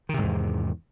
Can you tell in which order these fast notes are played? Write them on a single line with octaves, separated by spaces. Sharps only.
D#3 C3 G#2 E2